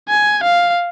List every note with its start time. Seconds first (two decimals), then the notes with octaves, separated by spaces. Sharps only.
0.09 G#5
0.43 F5